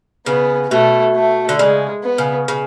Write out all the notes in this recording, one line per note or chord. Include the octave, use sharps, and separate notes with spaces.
C#3 B3
B2 A3
A3
D3
C#3 G#3
B3
C#3
C#3